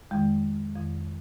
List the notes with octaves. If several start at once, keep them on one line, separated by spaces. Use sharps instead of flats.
F2 D#3 G#3
F2 D#3